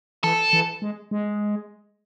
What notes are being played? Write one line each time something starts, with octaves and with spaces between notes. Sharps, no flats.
E3 A4
E3
G#3
G#3